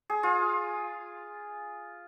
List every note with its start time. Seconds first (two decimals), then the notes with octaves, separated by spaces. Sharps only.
0.10 G#4
0.23 F4